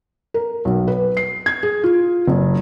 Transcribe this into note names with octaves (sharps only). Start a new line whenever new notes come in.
A#4
B1
B4
C7
G#6
G#4
F4
F#1